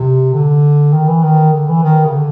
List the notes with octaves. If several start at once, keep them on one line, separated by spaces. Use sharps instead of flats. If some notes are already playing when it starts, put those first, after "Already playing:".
Already playing: C3
D3
D#3
E3
D#3
D3
E3
D#3
C#3
D3